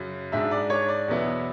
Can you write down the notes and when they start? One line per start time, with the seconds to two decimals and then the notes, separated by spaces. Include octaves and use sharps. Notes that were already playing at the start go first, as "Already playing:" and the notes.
Already playing: F#2 C#3 F#3
0.32 G#2 G#3 D4 E5
0.51 D5
0.70 C#5
0.88 D5
1.08 E2 B2 F#3 B3 E4